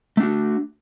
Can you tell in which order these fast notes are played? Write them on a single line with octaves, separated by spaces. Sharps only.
A3 D4 F#4